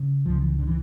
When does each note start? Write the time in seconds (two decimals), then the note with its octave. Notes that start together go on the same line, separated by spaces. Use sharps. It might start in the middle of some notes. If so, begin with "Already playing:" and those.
Already playing: C#3
0.26 C#2 C#3 F3
0.42 E3
0.59 D3
0.67 E3